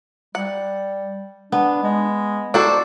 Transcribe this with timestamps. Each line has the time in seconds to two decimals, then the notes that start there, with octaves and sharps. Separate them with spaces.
0.35 G3 F#5
1.52 B3 D4
1.82 G#3
2.54 D4 F#4 A4 C5